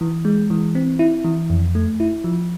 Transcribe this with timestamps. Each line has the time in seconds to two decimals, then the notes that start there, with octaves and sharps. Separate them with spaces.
0.01 E3
0.25 G#3
0.50 E3
0.75 C4
0.99 E4
1.24 E3
1.50 F2
1.75 A3
2.00 E4
2.24 F3